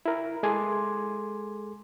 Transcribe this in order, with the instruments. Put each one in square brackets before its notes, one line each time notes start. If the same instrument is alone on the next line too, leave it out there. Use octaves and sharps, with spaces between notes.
[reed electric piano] E4 A#4
G#3 G#4 A4 G#5 C6 D6